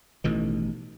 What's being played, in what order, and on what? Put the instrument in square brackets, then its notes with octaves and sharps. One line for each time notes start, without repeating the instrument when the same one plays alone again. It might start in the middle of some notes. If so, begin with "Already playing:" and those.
[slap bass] A1 B2 D#3 [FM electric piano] E3 A3 D#4